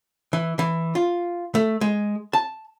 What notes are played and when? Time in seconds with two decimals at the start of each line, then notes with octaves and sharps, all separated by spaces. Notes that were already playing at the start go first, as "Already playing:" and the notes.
0.33 E3
0.59 E3
0.95 F4
1.55 A3
1.81 G#3
2.33 A5